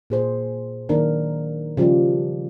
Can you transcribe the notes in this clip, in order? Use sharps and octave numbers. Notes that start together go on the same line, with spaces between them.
A#2 G#4 C5
D#3 F#3 A#3 D4 A#4
C#3 F3 G3 F4 G4